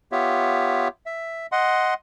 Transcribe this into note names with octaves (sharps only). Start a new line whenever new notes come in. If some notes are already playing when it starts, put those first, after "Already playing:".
B3 F4 G4 C#5 E5
E5
D#5 F#5 C6